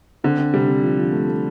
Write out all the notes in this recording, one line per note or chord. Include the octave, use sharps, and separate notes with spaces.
D3 C4
C4
C3 G3
C3
F3
F3
A3
A3